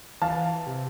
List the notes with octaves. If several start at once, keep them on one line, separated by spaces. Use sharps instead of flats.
E3 F5 A5
C3